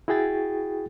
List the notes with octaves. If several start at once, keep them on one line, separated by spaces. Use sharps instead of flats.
E4 F#4 G#4 G5 A6